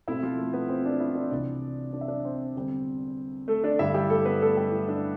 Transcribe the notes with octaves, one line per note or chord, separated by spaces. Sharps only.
B2 A3 C4 E4 E5
F3 F4
A3 A4
B3 B4
C4 C5
D4 D5
E4 E5
D4 D5
C2 C3 E3 D4 D5
D4 D5
E5
D4 D5
C4 C5
E2 D3 G3 C4
A3 A4
D4 D5
G2 D3 G3 E4 E5
G3 G4
A3 A4
B3 B4
A3 A4
G3 G4
E4
D4